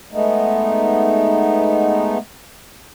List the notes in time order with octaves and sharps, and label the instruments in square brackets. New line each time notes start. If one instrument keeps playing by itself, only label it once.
[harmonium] G#3 A3 B3 D#4